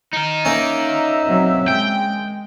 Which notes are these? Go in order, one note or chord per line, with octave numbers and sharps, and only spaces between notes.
D#4 A#4
A#3 C#4 E5
F#3 C4
G#3 G5